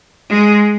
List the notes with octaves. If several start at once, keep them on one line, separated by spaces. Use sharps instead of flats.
G#3